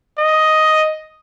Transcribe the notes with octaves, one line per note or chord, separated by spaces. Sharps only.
D#5